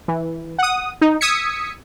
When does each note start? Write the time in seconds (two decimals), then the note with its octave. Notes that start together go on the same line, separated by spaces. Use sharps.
0.08 E3
0.58 F#5 D#6
1.01 D#4
1.21 D#6 E6 G#6 B6 C#7